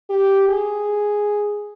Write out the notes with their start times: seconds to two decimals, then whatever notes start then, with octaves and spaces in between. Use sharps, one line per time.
0.10 G4
0.49 G#4